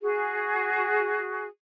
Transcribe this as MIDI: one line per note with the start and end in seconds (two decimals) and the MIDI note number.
0.01 1.48 66
0.01 1.48 68